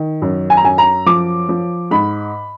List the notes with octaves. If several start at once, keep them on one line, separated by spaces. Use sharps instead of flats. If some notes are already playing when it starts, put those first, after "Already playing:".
Already playing: D#3
F#2
G#5
A#5
F#2 G#5
A#5
F3 D6
F3
G#2 B5